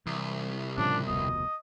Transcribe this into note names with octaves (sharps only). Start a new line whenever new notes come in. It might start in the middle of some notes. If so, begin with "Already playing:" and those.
C2 E3
A2 C#3 F3 D4
F1 D2 B2 D#5